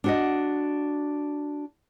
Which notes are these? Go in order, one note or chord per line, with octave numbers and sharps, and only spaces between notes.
D4 F#4 D#5